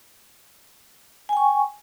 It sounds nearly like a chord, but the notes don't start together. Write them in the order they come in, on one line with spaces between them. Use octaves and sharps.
G#5 G5 C#6